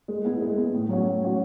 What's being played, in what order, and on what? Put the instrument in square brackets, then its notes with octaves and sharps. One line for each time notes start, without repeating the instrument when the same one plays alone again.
[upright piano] G#3
B3 E4
G#3
B3
E4
A2
F#3 C#4 F#4
A2
F#3 C#4 F#4